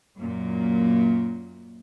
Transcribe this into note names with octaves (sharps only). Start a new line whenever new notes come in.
F#2 A#2